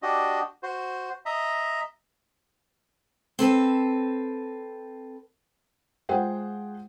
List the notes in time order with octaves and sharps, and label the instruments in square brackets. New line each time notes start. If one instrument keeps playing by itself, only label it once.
[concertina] D4 F#4 G4 D#5
F#4 C5
D#5 E5 A#5
[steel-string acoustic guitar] C4 A4 B4
[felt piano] G#3 F4 G#4 C5 F#5 G5